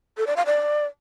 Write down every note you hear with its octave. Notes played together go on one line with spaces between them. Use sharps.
A4
D5
F5
D5